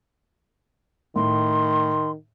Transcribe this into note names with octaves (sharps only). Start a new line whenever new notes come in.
A2 D#3 C6